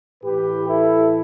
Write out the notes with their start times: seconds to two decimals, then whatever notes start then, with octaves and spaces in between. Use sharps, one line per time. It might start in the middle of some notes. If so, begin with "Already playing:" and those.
0.23 A2 E3 G4 B4
0.68 E4 A4